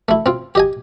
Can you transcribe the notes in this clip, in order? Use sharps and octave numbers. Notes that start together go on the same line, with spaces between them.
A3 E4
C4 F4
G4 D#5 G#5